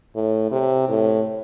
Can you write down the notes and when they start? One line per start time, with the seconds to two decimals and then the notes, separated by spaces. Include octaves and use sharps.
0.15 A2
0.51 C3
0.89 A2